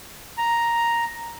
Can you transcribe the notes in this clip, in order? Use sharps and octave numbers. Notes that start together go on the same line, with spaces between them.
A#5